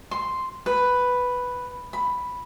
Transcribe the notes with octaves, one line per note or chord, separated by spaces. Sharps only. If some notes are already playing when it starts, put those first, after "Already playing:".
C6
B4
B5